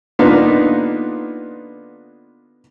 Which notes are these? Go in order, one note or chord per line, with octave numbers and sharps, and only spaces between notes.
D3 A#3 B3 D4 D#4 F4